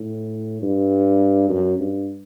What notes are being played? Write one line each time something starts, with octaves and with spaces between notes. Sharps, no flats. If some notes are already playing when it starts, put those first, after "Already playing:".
Already playing: A2
G2
F#2
G2